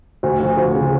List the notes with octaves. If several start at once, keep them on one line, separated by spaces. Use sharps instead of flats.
D2
F3
D2
C#3